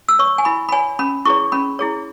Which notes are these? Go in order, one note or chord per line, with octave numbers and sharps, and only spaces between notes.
E6
C#5 C#6
G#5
E4 B5
B5
C#5 G#5
C#4 B5
E4 G#4 C#5 C#6
C#4 B5
E4 G#4 C#5